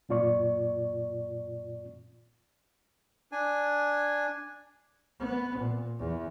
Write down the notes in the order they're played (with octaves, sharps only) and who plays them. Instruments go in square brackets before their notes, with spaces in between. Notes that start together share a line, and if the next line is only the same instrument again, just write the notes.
[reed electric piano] F#2 A#2 F4 D5 C#6
[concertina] D4 G#5
[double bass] B3
A#2
E2